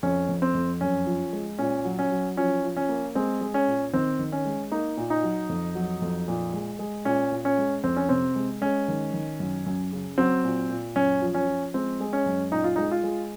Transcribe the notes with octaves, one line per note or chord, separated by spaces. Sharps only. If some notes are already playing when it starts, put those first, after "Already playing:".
F2 C#4
F2
C4
F2
F#2 C#4
F3
G#3
A#2 C#4
F#3
C#4
F#3
F3 C#4
F3
C#4
A#3
G#3 C4
G#3
C#4
A#2
D#3 C4
D#3
C#4
G#3
A#3 D#4
A#2
D#4
F#3
F2
F#3
F2
A#2
G#3
G#3
A#2 C#4
A#2
C#4
G#3
F2 C4
C#4
C3 C4
G#3
G#3 C#4
D#3
D#3
F#2
F#2
C#3
F#3 C4
A#2
A#2
F#2 C#4
F3
C#4
F3
G#3 C4
G#3
C#4
F#2
A#2 D#4
F4
G#3 D#4
F4
G#3